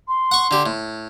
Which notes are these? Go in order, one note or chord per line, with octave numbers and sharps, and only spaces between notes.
C6
F#5 C#6
D3 G4
A2